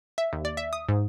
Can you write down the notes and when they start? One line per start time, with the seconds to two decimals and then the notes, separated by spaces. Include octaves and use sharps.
0.18 E5
0.33 D#2
0.45 D5
0.57 E5
0.73 D#6
0.89 G#2